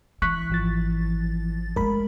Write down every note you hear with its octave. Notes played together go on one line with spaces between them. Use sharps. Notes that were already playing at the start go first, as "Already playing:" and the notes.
E3 C#6 F#6 B6
G#1 F3 A6
G#3 A3 A#4 B5